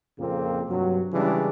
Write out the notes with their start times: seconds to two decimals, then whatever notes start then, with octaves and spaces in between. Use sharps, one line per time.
0.18 F2 A#2 C#3 A#3 C4
0.69 G2 C3 F#3
1.13 C#3 E3 G3 G#3 D4